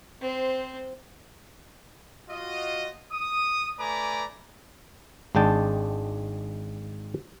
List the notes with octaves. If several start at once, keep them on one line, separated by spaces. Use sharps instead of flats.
C4 C5
F4 F#4 D#5
D#6
A3 B4 D5 G#5 A#5 D6
G#1 G#3 D4 G5 A5